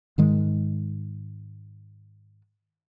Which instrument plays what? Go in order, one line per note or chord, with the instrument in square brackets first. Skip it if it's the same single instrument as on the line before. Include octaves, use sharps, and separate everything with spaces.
[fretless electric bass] G#2 D#3 G#3